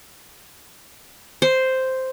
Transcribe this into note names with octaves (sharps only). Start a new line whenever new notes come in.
C5